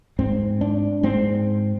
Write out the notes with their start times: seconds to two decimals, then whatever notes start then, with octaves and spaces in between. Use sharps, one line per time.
0.19 G#2 C4
0.61 D4
1.03 G#2 C4